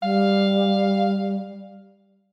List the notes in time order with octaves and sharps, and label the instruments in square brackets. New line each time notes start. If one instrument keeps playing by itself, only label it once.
[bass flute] G3 [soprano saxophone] F5